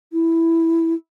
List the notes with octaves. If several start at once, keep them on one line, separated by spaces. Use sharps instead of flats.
E4